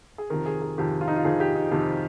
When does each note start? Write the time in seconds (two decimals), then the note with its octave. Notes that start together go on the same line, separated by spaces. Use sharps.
0.18 G#4
0.30 F2 C3 D#3 A#4
0.46 G#4
0.62 G#4
0.78 F2 C3 D#3 G4
1.01 F4
1.08 D#4
1.16 F4
1.24 F2 C3 D#3 G#4
1.40 G4
1.55 D#4
1.71 F2 C3 D#3